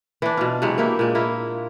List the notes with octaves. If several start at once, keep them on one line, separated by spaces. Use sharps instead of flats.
E3 D4
B2 F4
C3 E3 F#3 G#3
A#3 E4 G4
A#2 G#3
A#3 E4 F4